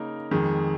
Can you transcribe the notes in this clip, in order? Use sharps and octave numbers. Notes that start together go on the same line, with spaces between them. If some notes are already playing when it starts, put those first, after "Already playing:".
Already playing: C#3 A#3 D#4 A#4
F2 D#3 G#3